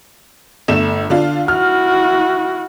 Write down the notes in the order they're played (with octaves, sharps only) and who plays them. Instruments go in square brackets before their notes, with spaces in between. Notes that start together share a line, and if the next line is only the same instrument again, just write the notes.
[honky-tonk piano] G1 A3 E7
D3 D4 F4
[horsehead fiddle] E4 F#4 [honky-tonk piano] F6